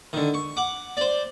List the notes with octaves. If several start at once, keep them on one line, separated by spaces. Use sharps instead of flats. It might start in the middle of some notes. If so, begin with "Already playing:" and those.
D3 D#3
C#6
F#5 D6
C5 D5